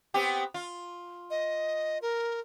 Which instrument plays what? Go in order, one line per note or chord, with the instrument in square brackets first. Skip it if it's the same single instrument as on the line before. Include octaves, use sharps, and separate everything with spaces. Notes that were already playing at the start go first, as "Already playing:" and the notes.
[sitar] B3 C4 G4
F4
[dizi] D#5
A#4